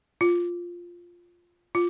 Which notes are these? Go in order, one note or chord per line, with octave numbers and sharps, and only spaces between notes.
F4
F4